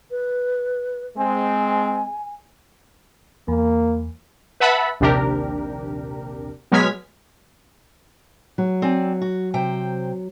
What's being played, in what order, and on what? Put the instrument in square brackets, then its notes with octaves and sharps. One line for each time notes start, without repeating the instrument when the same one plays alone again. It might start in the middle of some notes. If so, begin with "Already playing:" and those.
[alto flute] B4
[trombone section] G#3 C4 [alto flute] G#5
[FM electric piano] E2 [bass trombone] A#3
[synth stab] B4 E5 F#5 A5 B5
A#1 D#2 C3 D4 G4 A#4
B2 F#3 G#3 F6 G#6 B6
[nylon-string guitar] F#3
[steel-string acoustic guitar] C4 D5 G#5
F#4
C3 C5 G5